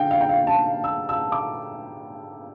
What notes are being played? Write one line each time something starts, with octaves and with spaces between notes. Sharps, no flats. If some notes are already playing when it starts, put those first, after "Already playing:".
Already playing: D3 F5 G5
F5
G5
F5
A5
E6
E6
D6